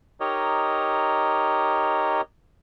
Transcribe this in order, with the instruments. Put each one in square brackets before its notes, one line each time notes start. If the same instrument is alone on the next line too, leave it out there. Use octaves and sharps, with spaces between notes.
[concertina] D#4 G4 A#4 C#5 D#5